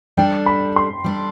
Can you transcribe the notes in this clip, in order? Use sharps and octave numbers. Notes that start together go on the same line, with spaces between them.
G3 D4 A4 G5
B5
C6
G3 D4 A4